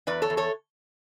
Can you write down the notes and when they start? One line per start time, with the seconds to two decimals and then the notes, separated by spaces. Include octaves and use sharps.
0.07 E2 B4 D5
0.22 A4 C#5
0.30 E2
0.37 A4 C#5